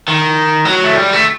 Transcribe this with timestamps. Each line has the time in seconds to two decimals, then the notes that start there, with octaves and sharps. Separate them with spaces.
0.08 D#3
0.65 F#3
0.84 A3
0.95 G3
1.13 A3